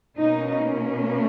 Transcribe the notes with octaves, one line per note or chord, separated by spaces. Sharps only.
B2 A#3 C#4 D#4